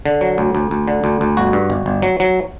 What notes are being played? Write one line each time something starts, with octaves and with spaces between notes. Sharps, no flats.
D3
F#3
D2
D2
D2
D3
D2
D2
G1 F#4
G2
G1
G1
F#3
F#3